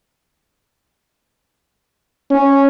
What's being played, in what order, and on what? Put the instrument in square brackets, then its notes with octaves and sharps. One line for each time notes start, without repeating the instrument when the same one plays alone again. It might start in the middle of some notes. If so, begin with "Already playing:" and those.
[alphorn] C#4